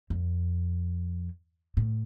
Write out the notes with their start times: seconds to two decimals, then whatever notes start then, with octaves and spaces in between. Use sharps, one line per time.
0.10 F2
1.77 A2